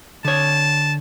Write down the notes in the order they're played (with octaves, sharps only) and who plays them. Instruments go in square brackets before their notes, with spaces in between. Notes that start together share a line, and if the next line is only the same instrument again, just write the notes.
[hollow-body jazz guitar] D3 C#5 [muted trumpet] A5